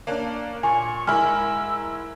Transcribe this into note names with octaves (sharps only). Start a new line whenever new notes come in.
A#3 C#4 D4
A#2 G#5 C#6
G#2 E4 A#4 G#5 E6 F6